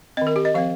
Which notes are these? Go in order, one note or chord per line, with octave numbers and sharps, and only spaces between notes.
D#3 C4 D#5
A#4
G4
D#5
F3 C4 F5